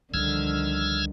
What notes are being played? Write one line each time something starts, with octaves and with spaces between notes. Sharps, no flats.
C#2 D3 D#3 F3 G3 E6 F6 G#6